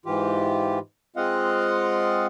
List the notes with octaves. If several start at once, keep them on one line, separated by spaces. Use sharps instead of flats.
G#2 E3 F4 G4
G#3 C4 F4 D#5 F5 F#5